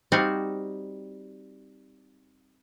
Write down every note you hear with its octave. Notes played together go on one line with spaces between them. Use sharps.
G3 C4 D#4 F#4 F5